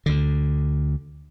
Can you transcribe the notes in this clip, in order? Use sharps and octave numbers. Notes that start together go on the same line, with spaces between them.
D2 D3